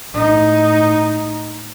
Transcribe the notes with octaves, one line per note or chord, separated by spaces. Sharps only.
A2 D#4